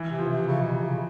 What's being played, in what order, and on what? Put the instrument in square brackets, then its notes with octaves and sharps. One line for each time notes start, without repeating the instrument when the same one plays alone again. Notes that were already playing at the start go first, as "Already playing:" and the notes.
Already playing: [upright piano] E3
[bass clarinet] C3
[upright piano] F3
[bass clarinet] C3
C#3
B2
C3
C#3